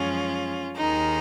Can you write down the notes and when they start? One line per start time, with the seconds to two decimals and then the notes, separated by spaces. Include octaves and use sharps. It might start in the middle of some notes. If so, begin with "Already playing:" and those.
Already playing: F#2 F3 G#3 C#4 F4
0.76 D#2 D#3 G#3 D#4